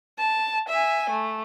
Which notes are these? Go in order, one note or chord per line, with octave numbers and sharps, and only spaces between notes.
A5
E5 G#5
A3